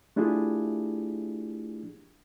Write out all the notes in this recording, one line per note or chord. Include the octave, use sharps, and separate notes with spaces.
A3 D4 E4 F4 G4 G#4